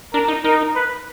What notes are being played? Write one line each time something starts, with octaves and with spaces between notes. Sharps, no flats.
D4 A#4
D#4
D#4 A#4
B4